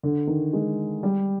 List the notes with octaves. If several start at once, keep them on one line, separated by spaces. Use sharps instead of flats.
D3
D#3
G#3
G3